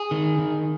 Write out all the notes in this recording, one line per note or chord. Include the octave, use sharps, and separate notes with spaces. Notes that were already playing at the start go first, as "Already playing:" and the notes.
Already playing: G#4
D#3
D#3